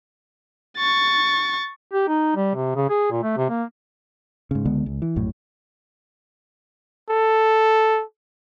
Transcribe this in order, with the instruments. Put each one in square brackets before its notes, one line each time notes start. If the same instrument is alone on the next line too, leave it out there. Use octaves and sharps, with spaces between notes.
[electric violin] C#6 A6
[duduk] G4
D#4
G3
C3
C#3
G#4
A#2
A3
C3
A#3
[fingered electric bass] G#2 C#3
C#2 D3 G#3 B3
C#2
E3
A#1 F#2 A2
[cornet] A4